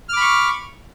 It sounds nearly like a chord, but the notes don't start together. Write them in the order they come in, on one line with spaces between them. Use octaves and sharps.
F6 D6 B5 C#6